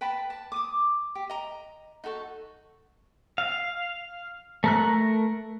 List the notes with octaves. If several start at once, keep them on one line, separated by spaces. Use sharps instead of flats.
B4 G5 A5 B5
A5
D6 D#6
G4
D#5 A#5
D#4 F#4 A4 C#6
F5
A3 A#4 F#6